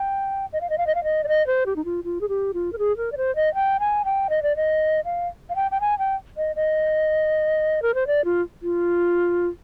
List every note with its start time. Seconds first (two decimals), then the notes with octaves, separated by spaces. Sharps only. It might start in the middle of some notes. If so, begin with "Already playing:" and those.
Already playing: G5
0.53 D#5
0.61 F5
0.70 D#5
0.78 F5
0.87 D#5
0.95 F5
1.04 D#5
1.24 D5
1.28 D#5
1.47 C5
1.66 G4
1.76 D#4
1.85 F4
2.04 F4
2.21 G#4
2.29 G4
2.54 F4
2.73 A#4
2.78 G#4
2.97 A#4
3.12 D5
3.17 C5
3.35 D#5
3.54 G5
3.80 G#5
4.05 G5
4.30 D#5
4.42 D5
4.56 D#5
5.05 F5
5.49 F5
5.56 G5
5.71 G5
5.81 G#5
5.99 G5
6.37 D#5
6.56 D#5
7.82 A#4
7.94 C5
8.07 D5
8.25 F4
8.63 F4